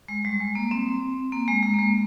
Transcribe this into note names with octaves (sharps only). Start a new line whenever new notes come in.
G#3
G3
G#3
A#3
C4
A#3
G#3
G#3
A#3
G#3